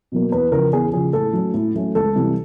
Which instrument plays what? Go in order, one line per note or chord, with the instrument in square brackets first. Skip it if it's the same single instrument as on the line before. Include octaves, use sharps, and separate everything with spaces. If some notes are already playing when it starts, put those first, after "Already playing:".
[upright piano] B2 F#3 A#3
E2 B4
C#3 F3 A#4
E2 G#4
C#3 F3 G#4
A2 A4
F#3 A3 C#4
A2
F#3 A3 C#4
C#2 A4
C3 E3 G3